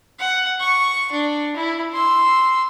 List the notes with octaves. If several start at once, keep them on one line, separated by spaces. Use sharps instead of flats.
F#5
C#6
D4
E4
C6 E6